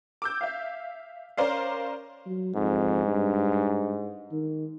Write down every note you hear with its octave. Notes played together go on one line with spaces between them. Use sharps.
D6 E6 G6
E5 F5
C#4 A#4 C5 D5 F5
F#3
F2 G#2
G2
D#3